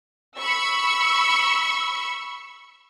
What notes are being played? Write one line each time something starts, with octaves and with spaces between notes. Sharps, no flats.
B5 C#6 E6